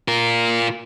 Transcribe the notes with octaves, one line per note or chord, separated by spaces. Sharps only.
F4 A#4